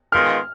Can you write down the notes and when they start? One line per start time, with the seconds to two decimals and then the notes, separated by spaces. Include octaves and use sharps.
0.12 D#3 G#3 B3 F4 F6